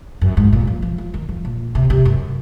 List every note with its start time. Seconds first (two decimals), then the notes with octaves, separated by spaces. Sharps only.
0.21 F#2
0.37 G#2
0.52 A#2
0.67 F3
0.82 F3
0.98 F3
1.14 D#3
1.29 F3
1.45 A#2
1.75 C3
1.90 C3
2.05 F#2